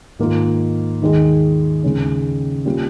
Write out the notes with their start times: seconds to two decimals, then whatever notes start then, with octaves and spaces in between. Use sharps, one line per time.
0.19 G#2 D#3 A#3 F4
1.02 D#2 D#3 G#3 D#4 G#4
1.83 D#2 C#3 G#3 C#4
2.65 G3 A#3 C#4 F4